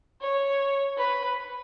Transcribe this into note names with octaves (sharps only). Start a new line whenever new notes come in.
C#5
B4